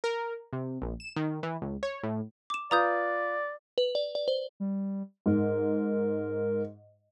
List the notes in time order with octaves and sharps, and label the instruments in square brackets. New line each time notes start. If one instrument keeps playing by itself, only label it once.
[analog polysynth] A#4
C3
A#1
E7
D#3
E3
C#2
C#5
A2
[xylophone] D6 E7
[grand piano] F4 B4 F5 [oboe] D5 [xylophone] A#5 D#6 G6
[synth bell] B4
D5
D5
C5
[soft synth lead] G3
[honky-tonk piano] G#2 [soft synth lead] A#4